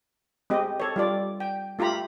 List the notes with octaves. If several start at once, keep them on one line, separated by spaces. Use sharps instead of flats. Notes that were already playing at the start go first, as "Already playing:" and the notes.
G#3 C4 G4 D#5
A4 C#5
G3 F4 D5
G5
A3 F4 G4 A#5 B5